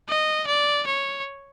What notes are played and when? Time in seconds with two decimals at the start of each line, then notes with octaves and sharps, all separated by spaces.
0.09 D#5
0.47 D5
0.87 C#5